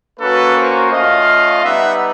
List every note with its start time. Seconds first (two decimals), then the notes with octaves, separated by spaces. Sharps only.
0.19 A#3 C#4 F#4 A4 B4
0.55 A#4 C5
0.91 A3 C#4 F4 D#5 F5
1.63 G3 B3 D#4 E5 F#5